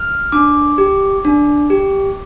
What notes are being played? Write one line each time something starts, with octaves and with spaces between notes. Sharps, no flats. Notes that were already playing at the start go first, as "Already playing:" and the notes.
Already playing: F6
D4 D6
G4
D4
G4